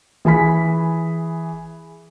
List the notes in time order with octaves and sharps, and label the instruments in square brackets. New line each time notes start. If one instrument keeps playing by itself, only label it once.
[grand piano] E3 G#4 G#5 B5 B6